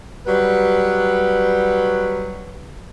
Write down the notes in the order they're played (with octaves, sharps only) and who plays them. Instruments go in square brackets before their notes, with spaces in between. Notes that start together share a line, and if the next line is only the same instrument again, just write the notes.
[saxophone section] F#3 G3 B4